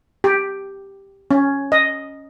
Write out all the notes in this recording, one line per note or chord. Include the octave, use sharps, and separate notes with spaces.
G4
C#4
D#5